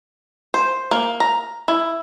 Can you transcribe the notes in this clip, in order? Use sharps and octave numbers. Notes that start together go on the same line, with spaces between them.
C5
A#3
A#5
E4